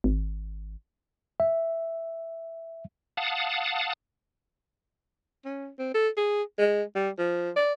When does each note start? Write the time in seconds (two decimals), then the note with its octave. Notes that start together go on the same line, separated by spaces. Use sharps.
0.04 G#1
1.40 E5
3.17 F5 F#5 A5 D#6
5.45 C#4
5.79 C4
5.94 A4
6.17 G#4
6.59 G#3
6.95 G3
7.18 F3
7.56 D5